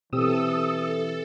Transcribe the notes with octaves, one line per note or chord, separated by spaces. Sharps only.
B2 E3 C4 G4 A4 D#6 E6